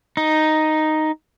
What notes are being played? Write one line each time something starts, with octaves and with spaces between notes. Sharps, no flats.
D#4